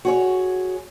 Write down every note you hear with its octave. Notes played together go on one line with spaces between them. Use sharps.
F#4 G#4 C#5